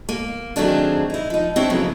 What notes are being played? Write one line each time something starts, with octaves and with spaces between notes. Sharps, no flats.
A#3
D#3 F#3 A3 C4 D4 G#4
D#4 E4
F3 D#4
C4 D4 E4 C#5
F2 C#3 F#3 A#3 B3